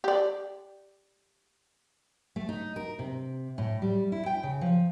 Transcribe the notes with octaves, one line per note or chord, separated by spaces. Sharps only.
G4 D5
A3
D#4
A#4
C3
A2
G3
E4
G5
C#3
F3